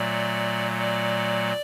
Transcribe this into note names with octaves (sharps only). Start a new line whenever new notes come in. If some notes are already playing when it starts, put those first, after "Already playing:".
Already playing: A#2 F#3 A3 D5
D5